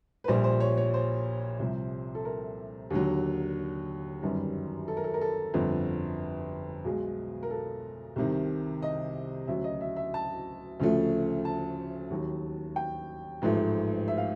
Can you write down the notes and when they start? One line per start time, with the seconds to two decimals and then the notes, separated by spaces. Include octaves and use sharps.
0.24 B4
0.28 A#1 A#2 G3 C5
0.44 C5
0.60 C#5
0.77 C#5
0.94 C5
1.59 C2 C3 F3
2.15 A4
2.25 A#4
2.90 D#2 D3 F#3
4.23 G1 F#2 D#3 G3
4.88 A4
4.97 A#4
5.04 A4
5.14 A#4
5.21 A4
5.54 G1 F2 D3
6.84 B1 B2 G#3 G#4
7.43 A#4
7.51 A4
8.16 C2 C3 D#3
8.82 D#5
9.47 D2 C#3 F#3 E5
9.64 D#5
9.81 E5
9.96 E5
10.14 A5
10.80 D2 C#3 F3 A3
11.45 A5
12.10 D#2 D#3 F#3
12.76 G5
13.42 A1 G#2 F3 A3
14.08 E5
14.18 F5